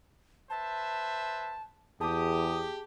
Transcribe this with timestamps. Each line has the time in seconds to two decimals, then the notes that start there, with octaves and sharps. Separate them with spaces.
0.50 B4 C5 E5 A5
2.01 E2 G4 G#4 A5 D6 D#6